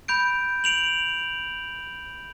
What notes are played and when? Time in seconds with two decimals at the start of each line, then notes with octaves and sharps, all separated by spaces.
0.08 B5 G6 D7
0.64 D7 F7 F#7